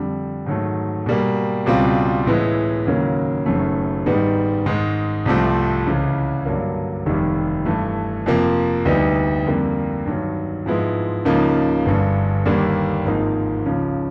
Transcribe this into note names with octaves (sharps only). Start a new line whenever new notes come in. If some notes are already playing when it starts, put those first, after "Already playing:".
Already playing: F2 D3 G3
G#2 D#3 F#3 A3
B2 G3 A#3
C#2 B2 G3 C4 F4
A2 E3 G#3 B3 E4
D#2 C#3 F#3 A#3
F#1 F#2 D#3 F#3 A3
G#2 D#3 G3 B3 D#4
G#2 D#3 G#3
C2 C3 F3 A3 C4
C#2 C#3 E3
G2 D3 F#3 A#3
F1 D#2 D#3 G3
G2 E3 A3
F2 C3 F3 A#3
D2 D3 G3 B3 D#4
F2 D3 G3 A#3
G2 D#3 F#3
G#2 F3 G#3 B3 E4
C#2 C#3 F3 A#3 D#4
G1 G2 D3
D#2 D3 G3 A#3
G#1 G#2 F3 A#3 D#4
C#2 C#3 F3